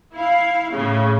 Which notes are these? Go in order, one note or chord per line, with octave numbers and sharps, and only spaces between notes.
E4 F5
A2 C#3